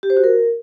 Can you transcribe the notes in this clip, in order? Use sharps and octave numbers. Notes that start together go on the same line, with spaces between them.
G4
C5
F#4
A#4